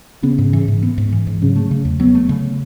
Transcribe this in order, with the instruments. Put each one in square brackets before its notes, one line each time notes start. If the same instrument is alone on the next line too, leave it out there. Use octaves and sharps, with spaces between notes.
[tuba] C#3 [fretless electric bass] B3
[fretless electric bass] G#2
E3
G#2
B3
G#2
E3
G#2
[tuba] C#3 [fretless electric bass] F#3
[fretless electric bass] A3
C#3
E2
[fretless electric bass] F#3 [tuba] B3
[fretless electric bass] A3
C#3